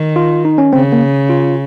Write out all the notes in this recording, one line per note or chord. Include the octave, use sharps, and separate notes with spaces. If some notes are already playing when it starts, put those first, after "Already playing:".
Already playing: D#3
F4
D#4
C#4
C#3 C4
A#3
F4